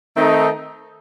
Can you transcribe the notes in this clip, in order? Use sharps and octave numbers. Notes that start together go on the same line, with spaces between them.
D#3 A3 C4 D#4 A4